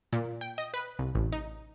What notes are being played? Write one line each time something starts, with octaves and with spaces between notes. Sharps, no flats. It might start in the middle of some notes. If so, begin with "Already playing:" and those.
A#2
G5
D#5
B4
C2
A1
D#4